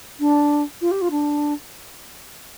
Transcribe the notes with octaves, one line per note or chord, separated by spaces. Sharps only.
D4
F4
G4
F4
D4